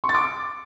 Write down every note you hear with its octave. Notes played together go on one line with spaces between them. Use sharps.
C#6
A6
D6